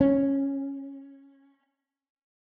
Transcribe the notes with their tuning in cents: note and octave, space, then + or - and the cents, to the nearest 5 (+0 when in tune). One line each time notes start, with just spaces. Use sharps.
C#4 -10